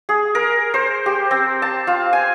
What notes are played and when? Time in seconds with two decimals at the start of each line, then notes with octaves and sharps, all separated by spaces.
0.09 G#4
0.35 A#4
0.74 C5
1.06 G4
1.31 C4
1.62 A5
1.87 F4
2.13 G#5